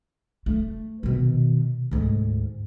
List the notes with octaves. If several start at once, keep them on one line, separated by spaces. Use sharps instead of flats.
A3
B2 D#3
D2 G#2